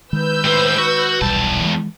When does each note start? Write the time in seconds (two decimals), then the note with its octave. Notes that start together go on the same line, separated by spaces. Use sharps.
0.13 D#3 G#3 B4 E6 G6
0.44 A2 C5
0.78 F#4
1.21 D#1 B1 E2 G3 A5
1.61 E3 F3 G#3